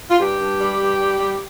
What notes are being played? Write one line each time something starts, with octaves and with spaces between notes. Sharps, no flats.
F4
G2 G4
G2
G3
G2
G3
G3